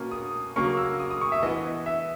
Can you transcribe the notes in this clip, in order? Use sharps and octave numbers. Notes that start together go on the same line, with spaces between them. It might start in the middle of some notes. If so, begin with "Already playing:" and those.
Already playing: B2 A#3 C#4
D#6
C#3 F#3 A#3 C#4 C#6
E6
D#6
D#6
C#6
E5
E3 B3 D#5
E5